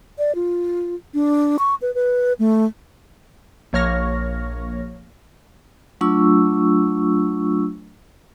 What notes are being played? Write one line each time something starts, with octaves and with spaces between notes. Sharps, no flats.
D5
F4
D4
C#6
B4
B4
A3
A#1 A#3 C#5 C#6 F6 A#6
F#3 A3 D4 F4 C#6 E6